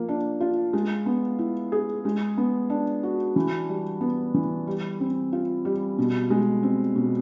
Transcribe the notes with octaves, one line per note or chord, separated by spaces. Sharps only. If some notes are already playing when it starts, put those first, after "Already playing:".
Already playing: F3 A#3
D4
F4
G#3
B3
E4
G#4
G#3
B3
D4
F#4
E3
G3
B3
E3
G3
C4
F4
G3
B2
G#3
C4
B2